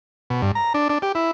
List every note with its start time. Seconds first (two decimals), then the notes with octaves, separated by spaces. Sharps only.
0.30 B2
0.42 G2
0.55 A#5
0.74 D4
0.89 D4
1.02 G4
1.15 E4